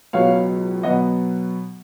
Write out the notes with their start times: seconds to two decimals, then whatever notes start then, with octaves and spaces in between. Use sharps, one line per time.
0.13 C#2 B2 F#3 B3 C#5 F5
0.83 B2 F#3 B3 D#5 F#5